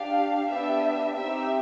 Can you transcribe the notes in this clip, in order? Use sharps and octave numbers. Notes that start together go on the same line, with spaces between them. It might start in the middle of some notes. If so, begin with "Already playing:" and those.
Already playing: D4 G4 F5
B3 D4 G4 E5
C4 D#4 G4 E5